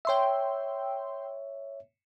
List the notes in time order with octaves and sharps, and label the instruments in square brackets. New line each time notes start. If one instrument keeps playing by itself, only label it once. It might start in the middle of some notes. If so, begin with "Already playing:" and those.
[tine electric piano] C#5 E5 [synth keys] G5 C6 E6